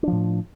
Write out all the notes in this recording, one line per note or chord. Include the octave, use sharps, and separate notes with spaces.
A2 F3 D4